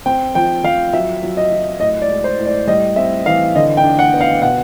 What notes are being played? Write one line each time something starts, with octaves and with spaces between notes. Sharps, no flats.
C4 G5
F3 G5
F3 F5
F#3 E5
F#3
D#5
F#3
A2 D#5
D5
G#3
C5
A2
D5
G3 D#5
C4 E5
E3 F5
D3 D#5
G5
D4
F#5
B3
F5
B2 F#5